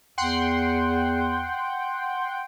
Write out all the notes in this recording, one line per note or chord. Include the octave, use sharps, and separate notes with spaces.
E2 F#5 G5 C6